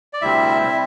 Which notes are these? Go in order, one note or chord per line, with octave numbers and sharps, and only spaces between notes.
D5
D2 C3 G3 C4 E4 E5
C3 G3 C4